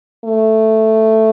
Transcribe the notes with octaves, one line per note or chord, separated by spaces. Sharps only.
A3